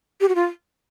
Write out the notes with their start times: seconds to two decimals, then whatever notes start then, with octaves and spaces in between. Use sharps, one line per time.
0.21 G4
0.29 F#4
0.35 F4